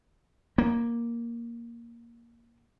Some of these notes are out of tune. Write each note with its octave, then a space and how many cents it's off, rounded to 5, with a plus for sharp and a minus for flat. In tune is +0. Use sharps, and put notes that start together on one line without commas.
A#3 +5